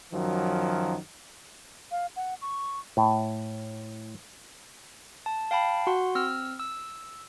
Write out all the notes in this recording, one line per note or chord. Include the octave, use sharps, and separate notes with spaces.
F#2 D#3 F3 F#3
F5
F#5
C#6
A2
A5
F5 G5 A5 B5
F#4 F#5 C6
C4 E6 F6
E6